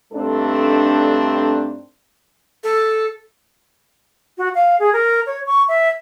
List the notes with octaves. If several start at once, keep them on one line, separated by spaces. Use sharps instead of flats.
G2 A3 C4 D4 D#4 A4
A4
F#4
F5
G#4
A#4
C#5
C#6
E5